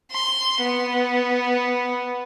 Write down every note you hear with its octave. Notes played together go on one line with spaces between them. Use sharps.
C6
B3